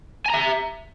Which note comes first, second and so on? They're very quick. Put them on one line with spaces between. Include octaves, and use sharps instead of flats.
G#5 A#5 E5